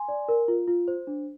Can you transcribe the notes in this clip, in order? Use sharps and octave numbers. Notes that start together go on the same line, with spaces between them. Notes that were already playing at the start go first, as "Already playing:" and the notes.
Already playing: G#5 C6
D5
A#4
F4
F4
C5
D4